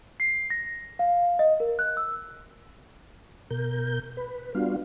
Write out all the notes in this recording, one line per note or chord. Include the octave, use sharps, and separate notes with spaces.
C7
A#6
F5
D#5
A#4
F#6
E6
B2 A#4 G6
B4
G3 B3 D4 F4 F#4 F5